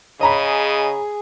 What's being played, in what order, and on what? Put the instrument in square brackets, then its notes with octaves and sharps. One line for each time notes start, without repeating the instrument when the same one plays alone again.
[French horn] C#3 [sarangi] G#4 [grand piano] C#5 A#5 B5 [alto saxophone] D#5